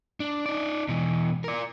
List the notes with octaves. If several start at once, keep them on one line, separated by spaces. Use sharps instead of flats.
D4
D#4 D5
B2 E3
A#4 D5